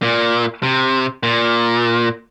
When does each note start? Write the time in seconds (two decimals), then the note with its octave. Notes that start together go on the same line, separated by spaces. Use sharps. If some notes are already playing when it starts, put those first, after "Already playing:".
0.02 A#2
0.63 C3
1.23 A#2